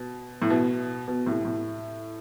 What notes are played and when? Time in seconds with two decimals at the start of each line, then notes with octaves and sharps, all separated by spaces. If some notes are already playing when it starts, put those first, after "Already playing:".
Already playing: B2
0.42 A2
0.50 B2
1.08 B2
1.26 A2 C3
1.45 A2